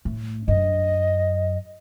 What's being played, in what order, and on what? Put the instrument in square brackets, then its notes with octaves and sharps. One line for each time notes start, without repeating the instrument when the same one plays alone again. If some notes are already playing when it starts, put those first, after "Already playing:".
[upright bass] A2
[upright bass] F#2 D4 [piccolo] D#5